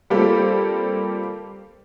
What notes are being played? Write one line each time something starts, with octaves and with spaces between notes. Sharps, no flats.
G3 A#3 C4 F4 G4 A4